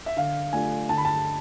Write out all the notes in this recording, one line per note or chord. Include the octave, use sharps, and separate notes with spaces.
E5
D3 F5
A3 D4 F4 G#5
D3 A5
B5
A5